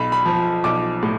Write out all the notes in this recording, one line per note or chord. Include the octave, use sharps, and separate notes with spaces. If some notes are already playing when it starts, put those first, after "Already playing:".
Already playing: B1 B5
B5
F3
B1 D6
A2